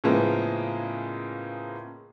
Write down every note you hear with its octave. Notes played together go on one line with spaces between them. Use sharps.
A2 C#3 F3 G#3 A#3 B3